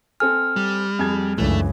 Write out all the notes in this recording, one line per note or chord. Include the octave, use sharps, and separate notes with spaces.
C4 A4 G#5 F6
G3
F2 G#4 G#6
C#2 F#2 E3 A3 D4